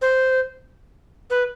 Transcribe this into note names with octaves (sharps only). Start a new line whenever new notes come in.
C5
B4